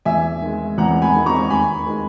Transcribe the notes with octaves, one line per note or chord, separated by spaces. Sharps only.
E2 E5 G#5
D#3 G#3
E2 F#5 A#5
G#5 B5
D#3 G#3
A#5 C#6
D#2 G#5 B5
D#3 G#3